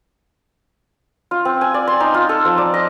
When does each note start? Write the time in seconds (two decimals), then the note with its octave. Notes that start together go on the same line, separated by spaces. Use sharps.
1.31 F4
1.45 C4
1.61 G#5
1.74 D5
1.87 C6
2.00 D#4
2.14 F4
2.29 A4
2.45 F3
2.58 D5
2.74 D#5